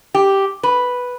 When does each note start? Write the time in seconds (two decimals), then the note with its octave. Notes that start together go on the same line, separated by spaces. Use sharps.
0.14 G4
0.63 B4